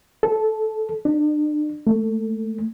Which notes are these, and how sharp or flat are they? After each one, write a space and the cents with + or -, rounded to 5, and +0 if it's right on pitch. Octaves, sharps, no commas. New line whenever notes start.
A4 -15
D4 +40
A3 +25